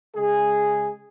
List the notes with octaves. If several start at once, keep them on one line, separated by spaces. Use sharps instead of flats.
C#3 G#3 G#4